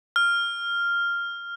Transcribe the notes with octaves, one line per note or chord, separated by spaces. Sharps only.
F6